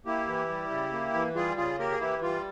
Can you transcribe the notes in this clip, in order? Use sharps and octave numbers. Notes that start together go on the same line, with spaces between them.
A#3 E4 G4
E3
G3
C#3
A#3
E3
G3 F4 G#4
C#3 F4 G#4
A#3 G4 A#4
G#4
E3 E4 G4
G3 F4